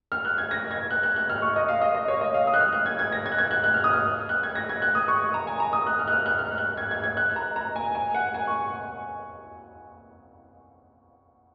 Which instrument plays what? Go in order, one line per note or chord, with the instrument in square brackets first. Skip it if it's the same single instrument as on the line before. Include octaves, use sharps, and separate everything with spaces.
[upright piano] F6
F#6
G#6
A#6
G#6
F#6
F#6
F#6
F6
C#6
D#5
F5
D#5
D#5
C#5
D#5
F5
D#6
F#6
F6
F#6
G#6
G#6
A#6
G#6
F#6
G#6
F#6
F#6
F6
D#6
F6
F#6
G#6
A#6
G#6
F#6
D#6
C#6
A#5
G#5
A#5
D#6
F#6
F6
F#6
F6
F#6
F6
F#6
G#6
G#6
G#6
F#6
A#5
A#5
G#5
G#5
F#5
G#5
C#6